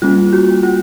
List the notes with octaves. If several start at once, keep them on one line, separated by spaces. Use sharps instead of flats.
G3 A#3 C#4 F4
F#4
F4